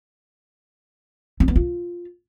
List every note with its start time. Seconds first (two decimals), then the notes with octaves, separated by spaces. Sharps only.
1.40 C4
1.48 B3
1.56 F4